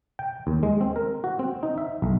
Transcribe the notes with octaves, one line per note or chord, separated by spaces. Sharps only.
G5
D#2
G#3
C4
A#4
F#4
C4
D#4
E5
B1